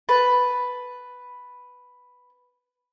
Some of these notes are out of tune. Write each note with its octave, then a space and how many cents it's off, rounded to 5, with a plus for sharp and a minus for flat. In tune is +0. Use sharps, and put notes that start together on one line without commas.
B4 +0 A5 +0